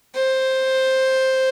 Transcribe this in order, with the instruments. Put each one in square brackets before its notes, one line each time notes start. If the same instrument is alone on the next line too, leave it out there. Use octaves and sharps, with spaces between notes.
[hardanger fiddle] C5